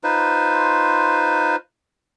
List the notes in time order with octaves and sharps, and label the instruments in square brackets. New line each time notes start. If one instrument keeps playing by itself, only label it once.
[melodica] D#4 F4 B4 C5